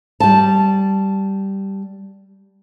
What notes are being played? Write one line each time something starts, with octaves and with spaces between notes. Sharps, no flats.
G3 A5